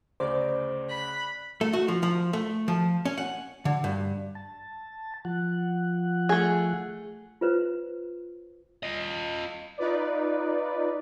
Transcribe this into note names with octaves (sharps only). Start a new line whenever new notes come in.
D2 C#3 C5 D5 D6
B5 F#6 B6
A3
F#4
F3
F3
A3
F3
C#4
F#5
D3
G2
A5
F3 F#5
A3 G#4
F4 B4 C5
F4 D#5
D#4 F4 B4 D5